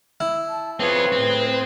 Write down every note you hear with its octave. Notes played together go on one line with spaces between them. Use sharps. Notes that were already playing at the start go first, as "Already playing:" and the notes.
E4
A5
C4 F4 G#4 B4 C#5
A2 C4 G#4